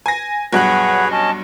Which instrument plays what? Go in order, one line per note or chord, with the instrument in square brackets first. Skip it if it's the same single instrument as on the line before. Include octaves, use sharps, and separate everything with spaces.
[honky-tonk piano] G#5 A#6
[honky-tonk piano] B1 G2 F#6 [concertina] G#4 B4 C#5 [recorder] F#5
[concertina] C#4 D#5 [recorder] A5